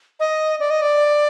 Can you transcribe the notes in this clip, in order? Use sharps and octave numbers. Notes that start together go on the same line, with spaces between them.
D#5
D5
D#5
D5